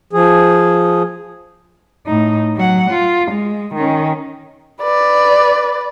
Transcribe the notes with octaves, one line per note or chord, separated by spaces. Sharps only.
F3 G#4
A2 D#4
F#3 F#5
F4
G#3
D#3 C#4
B4 D5